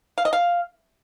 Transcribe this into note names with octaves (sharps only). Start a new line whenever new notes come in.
F5
D#5
F5